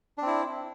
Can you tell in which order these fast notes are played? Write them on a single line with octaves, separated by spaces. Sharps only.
D4 C4 E4